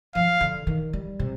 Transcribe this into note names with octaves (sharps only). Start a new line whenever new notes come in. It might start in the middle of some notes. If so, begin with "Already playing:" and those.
F3 F5
D3
D#3
G3
C3